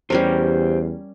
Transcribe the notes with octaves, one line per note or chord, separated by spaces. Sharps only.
E2 G3 C#4 G4 A#4 C5